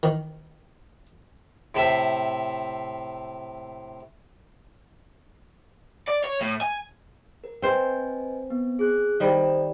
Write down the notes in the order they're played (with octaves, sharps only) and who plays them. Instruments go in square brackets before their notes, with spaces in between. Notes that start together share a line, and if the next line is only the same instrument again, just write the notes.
[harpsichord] D#3
A2 C3 C5 E5
[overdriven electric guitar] D5
C#5
A2
G#5
[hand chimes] A#4
[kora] C4 C5 [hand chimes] B4 D#5 G#5
[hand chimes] B3
G#4 F#6
[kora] D#3 G3 [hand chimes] A4 C5 D5
[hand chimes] D5